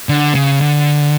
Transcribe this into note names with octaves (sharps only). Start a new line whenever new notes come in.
D3
C#3
D3